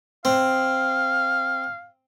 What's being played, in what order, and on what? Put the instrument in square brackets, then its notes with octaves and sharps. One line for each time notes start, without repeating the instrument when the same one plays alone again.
[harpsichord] C4 [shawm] F5